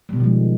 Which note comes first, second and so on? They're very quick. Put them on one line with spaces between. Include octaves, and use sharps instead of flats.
G3 B2 D#3 F3 G#3